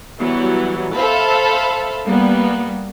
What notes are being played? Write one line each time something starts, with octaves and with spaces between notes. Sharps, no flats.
E3 F#3 G3 B3
A4 C5 E5 F5 A5 B5
G3 A#3 B3